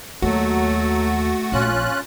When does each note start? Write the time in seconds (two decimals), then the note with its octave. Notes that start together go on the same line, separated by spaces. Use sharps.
0.22 D#2 F#3 A3 F#4
1.52 A#1 C#4 F4 F#6